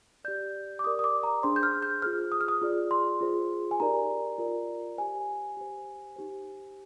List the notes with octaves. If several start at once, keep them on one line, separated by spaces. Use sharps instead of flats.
G4 D5 G6
D6
G4 A#4 D5 D#6
D#6
D6
A#5
D4 G#4 C5 C6
G6
F6
G6
F4 G#4 C5 F6
D#6
F6
D#6
F4 G#4 D5
C6
F4 G#4 C5
G#5
D#4 G4 A#4 D5 A#5
F4 A#4 D5
G4 C5 G#5
G4 C5
D#4 G4 C5